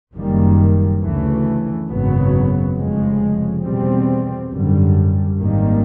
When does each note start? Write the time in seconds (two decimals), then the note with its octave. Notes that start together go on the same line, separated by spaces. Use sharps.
0.14 F#1 F#2 D#3 G3 A#3
1.01 D2 C#3 E3 A3
1.89 G#1 F#2 C#3 F#3 B3
2.76 F1 F2 C#3 F3 G#3
3.63 E2 B2 G3 C4
4.51 G#1 F#2 D3 G3
5.38 G#1 G#2 D#3 G3 A#3